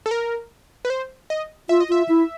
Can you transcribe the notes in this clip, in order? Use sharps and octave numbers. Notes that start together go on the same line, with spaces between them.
A4
A#4
B4
C5
D#5
F4 E5
D#5
F4 E5
E4